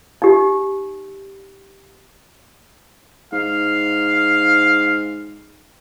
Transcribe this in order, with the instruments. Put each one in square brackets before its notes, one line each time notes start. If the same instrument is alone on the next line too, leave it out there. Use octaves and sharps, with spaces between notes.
[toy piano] D#4 G4
[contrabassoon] G#2 [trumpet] F5